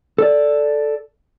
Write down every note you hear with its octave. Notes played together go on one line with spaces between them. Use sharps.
A4 D5